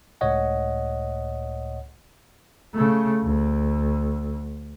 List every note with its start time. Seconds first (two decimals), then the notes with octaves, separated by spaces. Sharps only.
0.21 C#2 A2 C#5 D#5 F#5
2.74 C#3 A3
3.24 D2